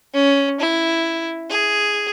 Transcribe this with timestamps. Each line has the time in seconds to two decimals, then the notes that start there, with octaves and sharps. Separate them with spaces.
0.14 C#4
0.60 E4
1.50 G#4